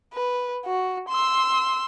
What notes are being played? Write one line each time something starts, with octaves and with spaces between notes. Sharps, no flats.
B4
F#4
C6 E6